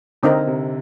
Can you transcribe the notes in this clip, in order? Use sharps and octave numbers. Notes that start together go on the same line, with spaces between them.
D3 C4 D#4 A#4
C3